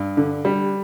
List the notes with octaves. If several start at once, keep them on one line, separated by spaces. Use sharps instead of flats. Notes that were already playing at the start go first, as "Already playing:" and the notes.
Already playing: G2
D3
G3